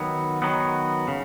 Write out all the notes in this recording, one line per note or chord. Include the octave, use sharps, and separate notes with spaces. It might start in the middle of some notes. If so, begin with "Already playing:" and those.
Already playing: D#3 F#3 B3
D#3 F#3 B3
C#3